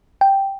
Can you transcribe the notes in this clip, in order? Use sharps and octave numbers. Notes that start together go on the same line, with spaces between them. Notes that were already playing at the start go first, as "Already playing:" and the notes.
G5